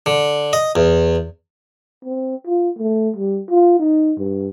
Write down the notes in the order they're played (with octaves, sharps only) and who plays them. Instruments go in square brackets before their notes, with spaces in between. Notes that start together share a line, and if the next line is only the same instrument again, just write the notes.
[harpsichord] D3
D#5
E2
[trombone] C4
F4
A3
G3
F4
D#4
G2